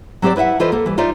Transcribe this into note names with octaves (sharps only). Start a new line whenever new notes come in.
F#3 C4 G4 A4 C5 D5
E4 B4 D#5 E5 F#5
E3 F4 A4 B4 C5 D#5
A#3 A4
E3 G3
D#4 F4 C5 D5 E5